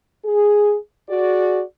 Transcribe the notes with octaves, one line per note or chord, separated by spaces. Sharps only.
G#4
F#4 G#4 D5